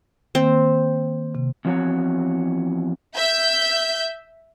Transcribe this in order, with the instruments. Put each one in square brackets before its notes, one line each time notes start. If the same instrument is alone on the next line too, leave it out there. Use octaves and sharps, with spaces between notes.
[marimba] D#3 A#3 [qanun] C4
[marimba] C3
[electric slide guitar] E2 F3 C4 F#4 C#5 A#5
[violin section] E5 G6